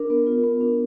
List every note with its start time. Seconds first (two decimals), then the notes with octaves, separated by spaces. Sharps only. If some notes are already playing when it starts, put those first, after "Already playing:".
Already playing: D4 A#4
0.10 B3
0.27 F4
0.44 B3
0.61 D4